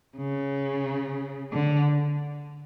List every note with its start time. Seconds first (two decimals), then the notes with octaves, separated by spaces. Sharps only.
0.17 C#3
1.53 D3